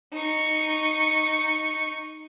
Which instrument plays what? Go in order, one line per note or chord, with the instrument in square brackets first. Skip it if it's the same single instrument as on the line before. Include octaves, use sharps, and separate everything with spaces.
[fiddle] D#4 C#6